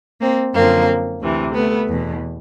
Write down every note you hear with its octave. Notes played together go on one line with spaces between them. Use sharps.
A#3 C4
F#2 D3 F3 A#3 C4
D2 C3 E3
A3 B3
E2 B2